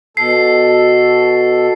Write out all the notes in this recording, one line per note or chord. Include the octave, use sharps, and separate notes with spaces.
B2 A4 C7